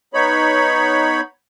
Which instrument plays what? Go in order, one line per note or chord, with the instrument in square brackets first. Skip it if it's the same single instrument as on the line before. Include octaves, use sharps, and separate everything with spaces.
[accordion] B3 D#4 C#5 B5